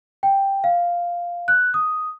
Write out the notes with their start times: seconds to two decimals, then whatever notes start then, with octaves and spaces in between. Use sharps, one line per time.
0.23 G5
0.64 F5
1.48 F#6
1.74 D#6